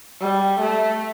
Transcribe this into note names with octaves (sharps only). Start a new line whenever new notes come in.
G3
A3